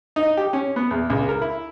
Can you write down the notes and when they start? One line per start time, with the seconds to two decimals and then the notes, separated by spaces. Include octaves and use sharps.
0.16 D#4
0.37 G4
0.53 C#4
0.76 B3
0.91 E2
1.10 C#2
1.29 A#4
1.42 E4